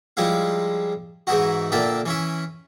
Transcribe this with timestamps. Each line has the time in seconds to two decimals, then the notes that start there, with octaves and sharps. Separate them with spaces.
0.17 F3 G3 G#3 E4 F5
1.27 G#2 E3 D#4 E4 F#4
1.72 A#2 D3 A#3 D5 E5 G5
2.06 E3 C#4 E4